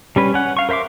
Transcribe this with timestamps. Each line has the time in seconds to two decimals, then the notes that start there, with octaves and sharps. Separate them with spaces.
0.16 G3 C#4 B4
0.34 C#4 F#5
0.57 F5 C#6
0.69 A#4 C5 E5 C6 D6